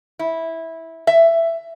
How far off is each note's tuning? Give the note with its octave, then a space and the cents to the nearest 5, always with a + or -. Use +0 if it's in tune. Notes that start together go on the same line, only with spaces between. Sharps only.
E4 -10
E5 +10